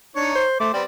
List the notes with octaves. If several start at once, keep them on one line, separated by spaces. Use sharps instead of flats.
D4 D#4 C#5
C5
A3 C5 D6
G3 B3 C4 D5